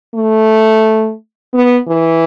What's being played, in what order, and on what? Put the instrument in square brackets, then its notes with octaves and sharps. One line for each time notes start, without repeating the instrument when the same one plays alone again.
[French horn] A3
B3
E3